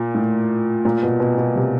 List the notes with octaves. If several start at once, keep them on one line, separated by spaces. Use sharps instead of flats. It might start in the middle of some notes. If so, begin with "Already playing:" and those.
Already playing: A#2
A2
A#2
B2
B2
B2
C3